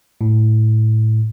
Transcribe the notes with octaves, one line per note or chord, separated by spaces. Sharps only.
A2